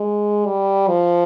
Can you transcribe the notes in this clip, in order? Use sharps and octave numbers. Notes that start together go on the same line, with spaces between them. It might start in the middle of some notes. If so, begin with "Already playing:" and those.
Already playing: G#3
G3
F3